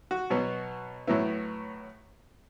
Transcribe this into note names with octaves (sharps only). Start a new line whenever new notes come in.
F#4
B2 F#3 B3
A2 F#3 B3 E4